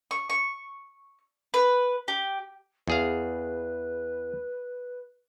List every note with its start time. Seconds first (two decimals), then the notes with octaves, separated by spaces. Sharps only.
0.11 C#6
0.30 C#6
1.54 B4
2.08 G4
2.88 E2 G#4 B4 F5